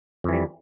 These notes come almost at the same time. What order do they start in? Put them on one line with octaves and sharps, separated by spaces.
F2 E3 G3